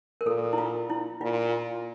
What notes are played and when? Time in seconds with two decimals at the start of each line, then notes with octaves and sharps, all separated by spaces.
0.21 A#4
0.26 A#2 A4
0.53 E4
0.58 F4
0.90 E4
1.21 A#2 F4